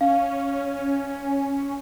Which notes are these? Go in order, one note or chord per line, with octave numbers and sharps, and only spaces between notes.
C#4 F5